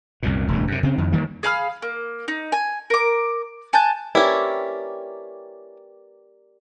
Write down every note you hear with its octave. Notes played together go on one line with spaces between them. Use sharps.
C2 F#2 A#2
E1 D2 G2
F#2 C3
C#3 C4
F2 D#3
D#3 E3 G3 A#3
G#4 F5 B5 F6
A#3
D#4
G#5
A#4 D6
G#5 A5 F#6 G6
C#4 E4 G4 A#4 B4 D5 G5 D6